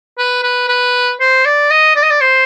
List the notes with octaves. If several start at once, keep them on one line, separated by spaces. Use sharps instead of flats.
B4
B4
B4
C5
D5
D#5
D5
D#5
D5
C5